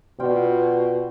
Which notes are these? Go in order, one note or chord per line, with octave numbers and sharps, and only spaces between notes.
B2 F4 D5 G5